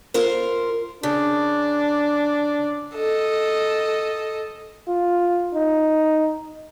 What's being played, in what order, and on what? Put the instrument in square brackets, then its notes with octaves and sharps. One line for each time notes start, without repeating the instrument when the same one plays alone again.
[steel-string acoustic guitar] F4 A#4 C5
[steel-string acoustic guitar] C#3 [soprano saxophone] D4
[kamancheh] A4 D#5
[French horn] F4
D#4